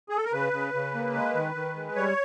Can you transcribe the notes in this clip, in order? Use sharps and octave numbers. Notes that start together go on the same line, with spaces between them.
G#4
A4
A#4
C#3 B4
C#3
C#3
A#3
G#3
D#3
D#3
G#3
G3 C#5